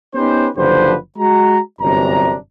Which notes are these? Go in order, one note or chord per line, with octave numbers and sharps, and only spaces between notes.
B3 C#4 D#4 G4 B4 C5
F#1 D3 F3 G4 B4 C5
G#3 F#4 A#5
G1 F#2 C3 E3 D4 A#5